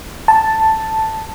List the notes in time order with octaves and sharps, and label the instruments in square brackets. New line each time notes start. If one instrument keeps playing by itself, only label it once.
[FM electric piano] A5